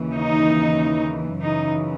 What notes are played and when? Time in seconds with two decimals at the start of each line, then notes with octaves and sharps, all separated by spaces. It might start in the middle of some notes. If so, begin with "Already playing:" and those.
Already playing: D#2 C#3 E3
0.14 D#4
1.39 F#2 C#3 E3 D#4